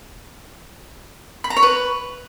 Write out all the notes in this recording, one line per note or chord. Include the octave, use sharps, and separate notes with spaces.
B5
A#5
C#5
B4